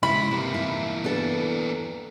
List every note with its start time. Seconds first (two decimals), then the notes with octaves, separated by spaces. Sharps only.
0.03 C#3 G#3 E4 B5
0.31 C3 E3 A#3
0.54 E4
1.04 B3 D4 A4